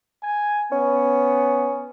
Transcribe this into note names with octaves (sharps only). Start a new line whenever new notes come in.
G#5
B3 C#4